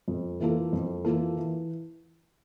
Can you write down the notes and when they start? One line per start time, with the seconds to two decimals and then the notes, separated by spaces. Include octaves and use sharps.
0.08 F2
0.40 E3 A#3 F4 A4
0.73 F2
1.05 E3 A#3 F4 A4
1.37 E3